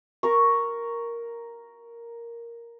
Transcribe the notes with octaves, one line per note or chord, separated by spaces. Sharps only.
A#4 A#5 C#6